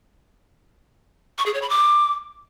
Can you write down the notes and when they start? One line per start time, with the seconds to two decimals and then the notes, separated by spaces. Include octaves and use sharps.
1.38 C#6
1.46 G#4
1.54 C#5
1.62 B5
1.70 D6